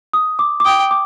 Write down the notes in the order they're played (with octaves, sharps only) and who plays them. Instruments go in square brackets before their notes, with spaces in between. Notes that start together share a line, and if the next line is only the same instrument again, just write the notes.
[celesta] D#6
D6
D6
[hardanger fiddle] G5 [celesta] D#6
[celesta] D6